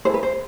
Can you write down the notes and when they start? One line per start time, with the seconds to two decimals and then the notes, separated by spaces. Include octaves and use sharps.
0.05 E4 A4 C5
0.14 B4
0.23 C5